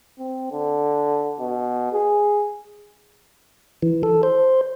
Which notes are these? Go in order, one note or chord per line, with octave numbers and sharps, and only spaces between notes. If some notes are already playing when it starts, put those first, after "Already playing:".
C4
D3
B2
G#4
E3
A4
C5